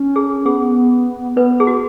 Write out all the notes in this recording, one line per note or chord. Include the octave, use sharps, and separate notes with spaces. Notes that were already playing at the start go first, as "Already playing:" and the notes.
Already playing: C#4
G#4
B3 G#4
B3 B4
G#4
F#4